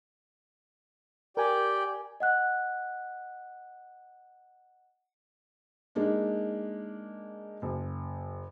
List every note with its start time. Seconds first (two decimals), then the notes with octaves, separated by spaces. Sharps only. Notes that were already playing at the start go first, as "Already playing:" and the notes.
1.37 G4 A#4 D5 G5 G#5
2.20 D#5 F#5 F#6
5.95 G#3 A#3 D4 D#4
7.62 F#1